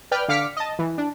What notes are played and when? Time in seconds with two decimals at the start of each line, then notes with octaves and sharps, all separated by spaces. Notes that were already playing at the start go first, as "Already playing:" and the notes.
0.11 B4 D5 G5 F6
0.28 D3 F5 D6 F6 B6 C#7
0.57 D#5 A5
0.79 E3
0.98 D4